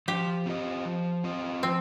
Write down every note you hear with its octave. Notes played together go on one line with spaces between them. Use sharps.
F3 G4
C4 F4 D#5
F3
C4 F4 D#5
F3 C4